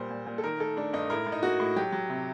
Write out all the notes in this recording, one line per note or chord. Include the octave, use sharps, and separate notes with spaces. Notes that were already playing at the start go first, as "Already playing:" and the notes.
Already playing: A#2 G3 C5
A#2
A#2
A4
D#3 A#4
A3 A4
A3 D4
G2 D#4
A2 A#4
A2
D#4
A#3 F#4
A2
F#3 G4
F#3
C3